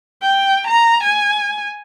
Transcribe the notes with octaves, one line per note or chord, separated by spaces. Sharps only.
G5
A#5
G#5